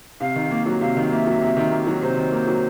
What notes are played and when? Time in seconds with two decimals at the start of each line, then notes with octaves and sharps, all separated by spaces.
0.20 C3 F5
0.36 D#3
0.51 A#3
0.66 F#3
0.81 C3 F5
0.96 D#3
1.12 A#3 E5
1.27 F#3
1.42 C3
1.57 D#3
1.72 A#3
1.87 F#3
2.02 C3 C5
2.17 D#3
2.32 A#3
2.47 F#3